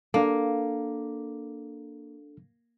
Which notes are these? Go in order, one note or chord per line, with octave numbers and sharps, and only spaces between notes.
A#3 D4 A4